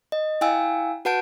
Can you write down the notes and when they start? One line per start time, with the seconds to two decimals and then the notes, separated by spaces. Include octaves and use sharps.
0.12 D#5
0.41 E4 F5 G5 G#5 E6
1.05 F#4 B4 F#5 A5 G6 D7